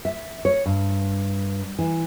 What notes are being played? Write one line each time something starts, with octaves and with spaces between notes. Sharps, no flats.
E5
C#5
G2
E3